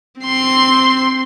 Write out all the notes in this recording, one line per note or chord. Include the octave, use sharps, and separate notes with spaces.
C4 C6